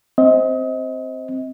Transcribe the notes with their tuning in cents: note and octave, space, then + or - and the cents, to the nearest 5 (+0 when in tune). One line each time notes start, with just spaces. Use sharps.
C4 +0 D#5 +30